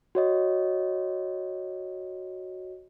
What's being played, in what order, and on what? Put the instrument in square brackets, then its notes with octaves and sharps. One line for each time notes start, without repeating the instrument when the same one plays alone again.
[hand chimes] F#4 C#5 D#5